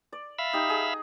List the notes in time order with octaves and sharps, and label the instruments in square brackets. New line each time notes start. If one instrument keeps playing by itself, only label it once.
[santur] D5
[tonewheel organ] E5 F5 B5
[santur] D#4 G4
G#4